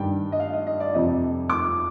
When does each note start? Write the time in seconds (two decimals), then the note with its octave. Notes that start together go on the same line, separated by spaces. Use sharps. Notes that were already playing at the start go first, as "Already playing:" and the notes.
Already playing: G2 D#3 G3 G5
0.32 D#5
0.40 F5
0.53 D#5
0.67 D#5
0.80 D5
0.95 F2 C3 F3 D#5
1.50 D6